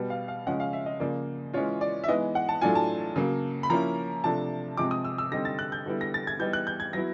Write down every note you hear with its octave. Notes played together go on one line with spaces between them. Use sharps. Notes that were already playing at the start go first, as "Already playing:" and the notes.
Already playing: B2 G3 B3
F5
F5
C#3 F3 G#3 C#4 F#5
F5
E5
D#5
C#3 F3 A#3 D5
E3 G#3 C#4 F4 C#5
D5
E5
E3 G#3 B3 D#4 D#5
F#5
A5
A2 F#3 A3 D4 F4 G#5
A5
C#3 F#3 A#3
B5
F3 A#3 C#4 E4 A#5
C3 F3 A3 D4 A5
C3 F3 G#3 C4 D6
D#6
E6
E6
D3 G3 C4 D#4 A#6
A6
F#6
G6
D3 G3 B3 E4
A#6
A6
G#6
E3 G3 B3 D#4 G6
F#6
G6
G#6
F#3 B3 E4 A#6